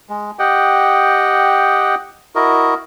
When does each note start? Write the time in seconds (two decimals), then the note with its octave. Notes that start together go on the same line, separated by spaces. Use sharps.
0.09 G#3
0.39 G4 D#5 F#5 G5
2.35 E4 F#4 A#4 D#5